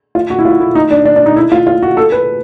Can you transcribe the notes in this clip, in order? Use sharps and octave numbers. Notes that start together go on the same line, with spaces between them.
F4
F#4
E4
F4
E4
D#4
D4
D4
D4
D#4
E4
F4
F4
F#4
A4
B4